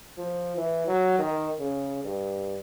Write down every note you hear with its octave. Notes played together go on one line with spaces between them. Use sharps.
F3
E3
F#3
D#3
C#3
G2